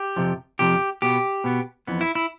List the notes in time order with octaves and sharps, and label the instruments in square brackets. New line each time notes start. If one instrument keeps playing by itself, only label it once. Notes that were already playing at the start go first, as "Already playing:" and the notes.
Already playing: [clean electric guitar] G4
F2 C3 F3
F2 C3 F3 G4
B2 B3 G4
B2 B3
F2 E3 B3
E4
E4